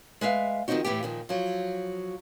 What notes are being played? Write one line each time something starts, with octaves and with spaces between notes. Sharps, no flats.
G#3 B4 E5 F5
D#3 F3 G3 C4 D#4 F#4
A2 E3 B3 G4
A#2 D#3 F3
F3 F#3